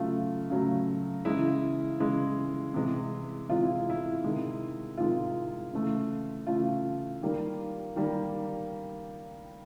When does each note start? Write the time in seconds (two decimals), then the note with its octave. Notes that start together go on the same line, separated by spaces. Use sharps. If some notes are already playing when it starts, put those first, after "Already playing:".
Already playing: C#3 F#3 A3 F4
0.50 C#3 F#3 A3
1.25 C#3 E3 G#3 E4
2.00 C#3 E3 G#3
2.74 C3 E3 G#3
3.49 C3 E3 G#3 F4
3.63 E4
3.90 E4
4.24 C3 D#3 G#3
4.98 C3 D#3 G#3 F4
5.73 C#3 E3 A3
6.47 C#3 E3 A3 F4
7.22 D#3 G3 A#3
7.96 D#3 G3 A#3